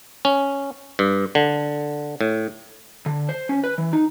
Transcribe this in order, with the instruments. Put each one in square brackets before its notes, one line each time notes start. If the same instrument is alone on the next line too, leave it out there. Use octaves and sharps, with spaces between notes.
[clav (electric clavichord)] C#4
G2
D3
A2
[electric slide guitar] D3
C5
C#4
B4
E3
D#4